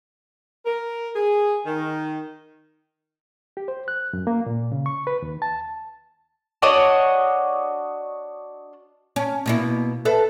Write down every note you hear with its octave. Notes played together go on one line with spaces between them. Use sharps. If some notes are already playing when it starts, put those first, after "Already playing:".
A#4
G#4
D#3
G4
C5
F#6
F#2
A#3
A#2
C#3
C#6
B4
D#2
A5
D4 F#4 C#5 D#5
C#4
B2 A#3 E4
A4 B4 E5